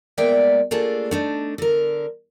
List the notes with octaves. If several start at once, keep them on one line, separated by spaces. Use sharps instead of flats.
G#3 A#3 B3 D5 E5 G5
A3 A#3 D4 F4 G#4 A4
A3 D4 D#4
D3 A#4